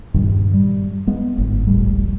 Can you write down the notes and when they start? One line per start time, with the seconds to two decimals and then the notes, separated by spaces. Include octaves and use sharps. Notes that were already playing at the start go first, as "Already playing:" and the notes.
0.14 G2 A#2 D#3 G3
0.54 G3
1.07 G#3 B3
1.38 G1 G#2
1.67 D#1 A#1 A2 G3